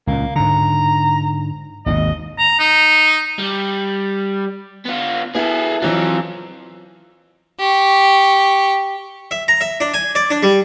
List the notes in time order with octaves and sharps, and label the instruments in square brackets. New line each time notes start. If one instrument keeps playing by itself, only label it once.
[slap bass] C#2 A#2 [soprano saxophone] A#3
[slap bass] G#2 D3 [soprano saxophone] A#5
[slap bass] G#1 D#2 B2 [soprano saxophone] D#5
[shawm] A#5
D#4
[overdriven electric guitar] G3
B3 F4
[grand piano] B3 E4 [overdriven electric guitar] G#4 A4
[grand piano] E3 F#3 [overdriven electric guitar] C4 F4
[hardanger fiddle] G4 C#6
[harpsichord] E5
A#5
E5
D4
G#5
D5
D4
G3